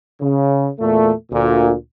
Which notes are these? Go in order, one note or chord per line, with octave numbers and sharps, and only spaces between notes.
C#3
E2 A#2 A3
D2 A#2